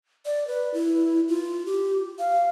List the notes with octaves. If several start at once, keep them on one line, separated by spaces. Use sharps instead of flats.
D5
B4
E4
F4
G4
F5